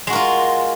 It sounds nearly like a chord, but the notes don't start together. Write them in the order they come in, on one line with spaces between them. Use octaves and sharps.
G#3 F#4 A#4 F4